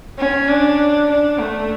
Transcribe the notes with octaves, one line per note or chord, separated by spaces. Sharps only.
C#4
D4
D4
A3